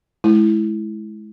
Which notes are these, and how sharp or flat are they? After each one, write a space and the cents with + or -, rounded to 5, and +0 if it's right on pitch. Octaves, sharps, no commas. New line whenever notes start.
G#3 +35 E4 +0